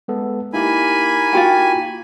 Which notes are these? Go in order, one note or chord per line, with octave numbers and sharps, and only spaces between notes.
G#3 B3 A4
A#3 D#4 E4 G4 G#5 B5
F4 F#4 G5